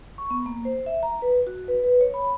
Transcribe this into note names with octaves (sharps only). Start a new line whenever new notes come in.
C#6
B3
A#3
C5
E5
A#5
B4
F#4
B4
B4
C#5
B5